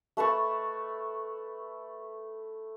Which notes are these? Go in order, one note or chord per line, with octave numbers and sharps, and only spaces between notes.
A3 B4 A5 C#6